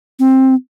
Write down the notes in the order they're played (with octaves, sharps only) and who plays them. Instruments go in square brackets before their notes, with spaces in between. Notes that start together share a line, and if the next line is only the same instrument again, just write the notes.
[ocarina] C4